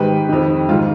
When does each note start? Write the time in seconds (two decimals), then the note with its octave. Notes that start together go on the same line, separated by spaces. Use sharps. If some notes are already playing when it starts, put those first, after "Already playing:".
Already playing: G#2 D#3 G4 B4
0.29 F2 D#3
0.68 G#2 D#3 F4